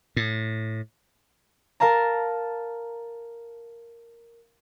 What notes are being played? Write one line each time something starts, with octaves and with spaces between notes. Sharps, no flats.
A2
A#4 F5 A5 A#5